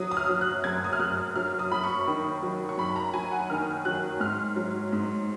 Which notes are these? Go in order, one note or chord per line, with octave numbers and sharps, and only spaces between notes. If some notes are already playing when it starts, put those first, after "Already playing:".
Already playing: F#3 D#6
D#6
F6
F#3
F#6
F#2 G#6
D#6
F6
F#2 F#6
F#3 F6
D#6
F#3 B5
C#6
D#3
F#3
C#6
F#2 B5
A#5
F#3 G#5
F#5
D#3 F6
F#3 F#6
G#2 F6
F#3
G#2